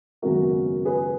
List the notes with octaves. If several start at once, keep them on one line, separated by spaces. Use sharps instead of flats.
G#1 F#2 C#3 G#3 B3 F#4 A#4
G#4 B4